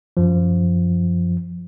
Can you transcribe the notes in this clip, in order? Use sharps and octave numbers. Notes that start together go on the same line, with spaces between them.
F#2 F3